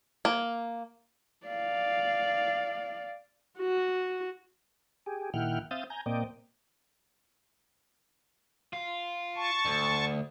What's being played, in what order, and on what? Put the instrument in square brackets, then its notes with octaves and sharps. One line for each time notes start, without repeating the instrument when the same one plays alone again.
[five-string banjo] A#3
[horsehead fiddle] D5 F5
[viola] F#4
[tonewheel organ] G4 G#4
A#2 D#3 E4 F#5 G5 F6
C4 E5 F5 D#6 G6 A6
G#5 A#5 G6
A#2 A#3 C4 D5 D#5 G5
[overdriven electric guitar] F4
[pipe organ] A5 C#6
[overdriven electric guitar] D2